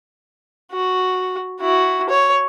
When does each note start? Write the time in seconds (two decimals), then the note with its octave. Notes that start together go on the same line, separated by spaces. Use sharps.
0.72 F#4
1.61 E4 F#4
2.09 C#5